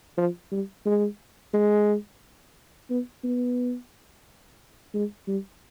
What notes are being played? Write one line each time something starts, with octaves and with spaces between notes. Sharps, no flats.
F3
G3
G#3
G#3
B3
B3
G#3
G3